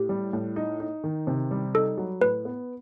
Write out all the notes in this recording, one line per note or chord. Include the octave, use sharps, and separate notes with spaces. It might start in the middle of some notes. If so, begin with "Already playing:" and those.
Already playing: A2 G4
G3
A2
D#4
D#4
D#3
C3
G3
D#4 A4
F#3
A2 B4
B3